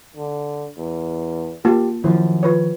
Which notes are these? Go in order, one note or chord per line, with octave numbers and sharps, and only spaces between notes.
D3
E2
A#3 F4 G4 A5
F#2 D#3 F3 E4 C5
F4 B4 C#5